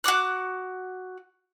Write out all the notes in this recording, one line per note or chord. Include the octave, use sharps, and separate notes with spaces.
F#4 F#5 D6 F#6